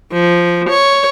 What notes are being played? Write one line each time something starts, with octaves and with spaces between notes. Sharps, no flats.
F3
C#5